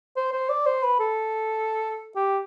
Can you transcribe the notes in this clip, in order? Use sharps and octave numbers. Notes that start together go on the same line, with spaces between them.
C5
C5
D5
C5
B4
A4
G4